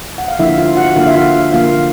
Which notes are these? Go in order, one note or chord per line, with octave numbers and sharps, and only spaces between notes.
F#5
F5
D3 F3 A#3 E4 E5
F4 F5
F#4 F#5
D3 F3 A#3 F4 F5
E5
F4 F5
D3 F3 A#3 F4 F5